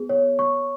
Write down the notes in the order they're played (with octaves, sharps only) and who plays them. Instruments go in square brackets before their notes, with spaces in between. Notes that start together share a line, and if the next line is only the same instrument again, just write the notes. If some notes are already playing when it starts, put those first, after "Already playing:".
Already playing: [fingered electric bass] B3 [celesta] G#4
[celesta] C#5
C#6